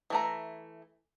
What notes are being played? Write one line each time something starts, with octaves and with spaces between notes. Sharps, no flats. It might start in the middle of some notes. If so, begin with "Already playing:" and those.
E3 A3 A#5